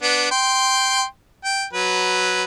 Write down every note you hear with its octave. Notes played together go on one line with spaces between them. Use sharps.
B3 D4
G5 C6
G5
F#3 B4